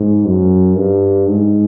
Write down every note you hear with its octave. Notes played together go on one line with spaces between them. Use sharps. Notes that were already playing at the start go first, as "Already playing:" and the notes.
Already playing: G#2
F#2
G2
G#2